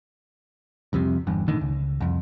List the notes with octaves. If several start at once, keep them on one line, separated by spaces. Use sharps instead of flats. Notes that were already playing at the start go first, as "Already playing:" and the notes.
C2 F2 C3
G1 E2 G2
B1 A2 D3 D#3
C#2
C2 F2